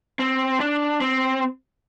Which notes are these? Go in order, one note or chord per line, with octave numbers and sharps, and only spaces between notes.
C4
D4
C4